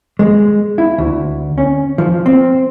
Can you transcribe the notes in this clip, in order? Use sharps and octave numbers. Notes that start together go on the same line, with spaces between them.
G#3
E4
D2
C#4
F3
C4